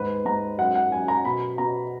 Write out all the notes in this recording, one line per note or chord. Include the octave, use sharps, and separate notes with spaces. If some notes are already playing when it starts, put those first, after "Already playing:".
Already playing: D#2 G#2 B4
G#2 A#5
F#2 F#5
F#5
F#2 G#5
A#5
B2 B5
B2 A#5